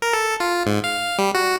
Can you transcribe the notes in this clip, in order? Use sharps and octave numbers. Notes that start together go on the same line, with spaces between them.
A#4
A4
F4
G#2
F5
G3
F#4